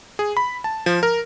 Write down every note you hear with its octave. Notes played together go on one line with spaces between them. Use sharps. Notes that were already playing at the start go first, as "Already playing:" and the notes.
G#4
B5
A5
F3
A#4